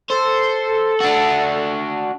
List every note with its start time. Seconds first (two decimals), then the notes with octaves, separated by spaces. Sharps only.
0.10 A4 C5
1.01 D4 F#4